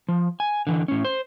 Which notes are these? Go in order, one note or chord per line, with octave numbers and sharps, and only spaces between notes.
F3
G#5
D3 E3
A2 C#4
C5